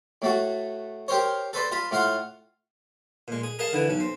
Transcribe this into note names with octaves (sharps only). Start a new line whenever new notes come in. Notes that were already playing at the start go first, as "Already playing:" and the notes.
A2 A3 F#4
G4 A#4 C5 C#5
A4 B4 C5 D5
F4 A5 B5
A2 F4 F5 F#5 C6
A#2 G#3
G#4
G#4 A#4 D#5 F5 A5
D3 E3 E4
B1 C#4
C4